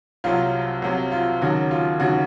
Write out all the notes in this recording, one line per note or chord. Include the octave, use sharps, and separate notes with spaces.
C2 C3 F#3 F4
C2 C3 F#3
F4
D#2 C#3 F#3 F#4
F4
D#2 C#3 F#3 F#4